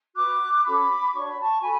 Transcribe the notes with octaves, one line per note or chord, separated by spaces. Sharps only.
F#4 B4 D6 F#6
C#4 F#4 A4 C#5 B5 D6
D4 F#4 C#5 C#6
B5
A5 C#6
F#4 A4 G#5 B5